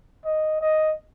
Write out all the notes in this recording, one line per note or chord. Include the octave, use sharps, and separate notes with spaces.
D#5
D#5